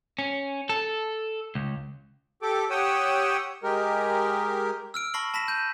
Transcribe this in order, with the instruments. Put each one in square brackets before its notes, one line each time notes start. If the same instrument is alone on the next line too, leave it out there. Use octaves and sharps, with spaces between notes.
[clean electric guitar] C#4
A4
C#2
[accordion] G4 A4 D6
G4 C#5 F#5 G5 D#6 E6
G#3 G4 A#4
[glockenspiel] E6 F6 D7
A5 B5 C#6 A#6 C7 F#7
A5 B5 A#6 B6 E7
G6 D#7